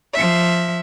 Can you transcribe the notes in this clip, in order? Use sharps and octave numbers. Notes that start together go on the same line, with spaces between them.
F3 E5